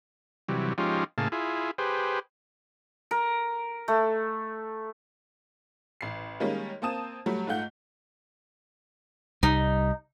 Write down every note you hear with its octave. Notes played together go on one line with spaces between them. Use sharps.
C3 E3 F#3 G3
F3 G#3 C#4 D#4 F4 G4
A2 C#3 A#3 G#4 F5 A5
E4 F4 G#4
G4 G#4 B4 C5
A#4
A3
A1 C7
D#3 G3 G#3 A#3 C#4
A#3 C4 A5 D#6 E7
F#3 G3 A3
G#2 A3 F4 F#5 G6
C2 G3 D#4